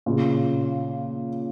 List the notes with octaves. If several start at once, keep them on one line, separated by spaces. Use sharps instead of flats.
A#2 C#3